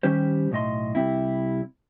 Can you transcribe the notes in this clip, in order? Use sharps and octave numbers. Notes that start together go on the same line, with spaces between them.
D#3 G3 C#4 G4 C5
B1 A2 D#5 C6
C2 G3 C4 E4